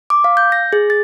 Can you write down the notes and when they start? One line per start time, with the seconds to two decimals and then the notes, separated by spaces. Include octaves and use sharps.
0.10 D6
0.24 F5
0.37 G6
0.52 A#6
0.73 G#4
0.90 A6